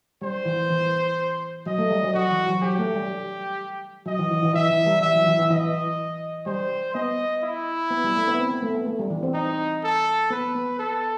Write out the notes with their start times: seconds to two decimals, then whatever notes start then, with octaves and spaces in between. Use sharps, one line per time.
0.22 G3 C5
0.46 E3
0.70 E3
1.66 F#3 D#5
1.78 A3
1.91 G3
2.03 F#3
2.14 F#3 F#4
2.31 E3
2.46 F#3
2.62 F#3 G4
2.79 A3
2.94 G3
4.06 F#3 D#5
4.19 E3
4.31 E3
4.43 E3
4.54 E3 E5
4.70 E3
4.87 G3
5.02 E3 E5
5.15 F#3
5.26 E3
5.39 E3
5.50 E3 D#5
6.46 G3 C5
6.94 B3 D#5
7.43 E4
7.91 B3
8.04 G3
8.16 A3
8.28 B3
8.39 C4
8.51 B3
8.62 A3
8.74 B3
8.86 A3
8.99 G3
9.10 E3
9.23 C4
9.34 D#4
9.83 A4
10.30 B3 B4
10.55 B3
10.79 A4